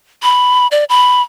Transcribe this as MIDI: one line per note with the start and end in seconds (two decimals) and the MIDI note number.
0.23 0.67 83
0.71 0.84 74
0.89 1.22 83